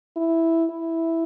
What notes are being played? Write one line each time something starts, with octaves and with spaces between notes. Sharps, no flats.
E4
E4